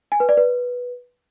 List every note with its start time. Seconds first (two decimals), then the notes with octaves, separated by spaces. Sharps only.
0.12 G#5
0.20 B4
0.29 D5
0.37 B4